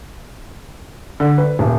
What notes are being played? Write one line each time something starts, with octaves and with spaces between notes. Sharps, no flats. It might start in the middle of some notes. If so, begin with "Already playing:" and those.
D3
B4
D#1